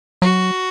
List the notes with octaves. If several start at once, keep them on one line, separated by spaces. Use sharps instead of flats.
F#3 F#4